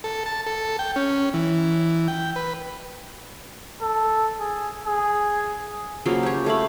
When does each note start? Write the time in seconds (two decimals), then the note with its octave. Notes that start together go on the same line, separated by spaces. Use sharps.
0.04 A4
0.26 A5
0.46 A4
0.79 G5
0.96 C#4
1.34 E3
2.08 G5
2.36 B4
3.82 A4
4.40 G#4
4.86 G#4
6.05 C#3 F3 F#3 A#3
6.23 G4 C#5
6.46 A3 F5 B5